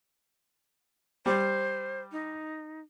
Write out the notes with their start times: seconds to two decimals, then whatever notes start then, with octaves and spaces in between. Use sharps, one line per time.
1.26 G3 C5
2.12 D#4